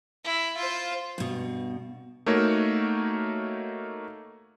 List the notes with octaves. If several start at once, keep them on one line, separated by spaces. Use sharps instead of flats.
E4
F4 C5
G2 B2
A3 A#3 D#4 F#4 A#4 C#5